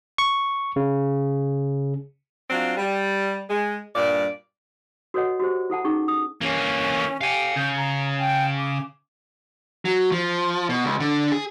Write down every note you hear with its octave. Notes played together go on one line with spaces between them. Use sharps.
C#6
C#3
F#3 C4 D4 F4
G3
G#3
G2 A#2 D5
F#4 A4 B4 C#5 D#5 F#5
F#4 G4 C5
E4 A4 F#5 A5
C#4 D#4 G#4 C#6
D#6
E3 A#3 C#4
G4 F5 G#5
C#3 G6
A#5
G5
D6
F#3
F3
B2
C#2
D3
G#4